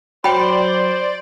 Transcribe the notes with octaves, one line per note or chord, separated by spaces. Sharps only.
F#3 C5 D5 G5 B5